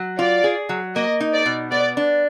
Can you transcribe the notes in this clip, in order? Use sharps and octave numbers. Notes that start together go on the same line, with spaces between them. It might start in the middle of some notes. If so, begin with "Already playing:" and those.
Already playing: F#3
F4 D5
G#4
F#3
A#3 D#5
D#4
D5
B2
B3 D5
D4